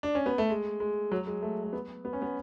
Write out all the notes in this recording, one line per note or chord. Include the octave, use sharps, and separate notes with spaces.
D4
C#4
B3
A3
G#3
G#3
F#3
G#3
A3
A3
B3
B3
C#4
B3